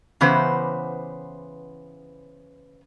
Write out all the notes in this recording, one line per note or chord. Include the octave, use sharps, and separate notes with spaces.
C#3 E3 B3 G4 B4 C5